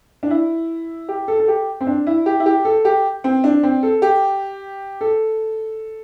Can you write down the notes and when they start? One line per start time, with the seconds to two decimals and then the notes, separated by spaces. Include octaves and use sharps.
0.23 D4
0.31 E4
1.09 G4
1.28 A4
1.40 A4
1.48 G4
1.81 C4
1.87 D4
2.07 E4
2.26 G4
2.40 E4
2.46 G4
2.65 A4
2.85 G4
3.24 C4
3.44 D4
3.63 C4
3.83 A4
4.02 G4
5.01 A4